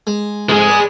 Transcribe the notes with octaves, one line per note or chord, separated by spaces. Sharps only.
G#3
F2 G#2 G#3 G#4
B4 D5